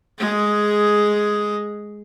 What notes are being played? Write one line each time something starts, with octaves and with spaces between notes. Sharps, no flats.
G#3 G#4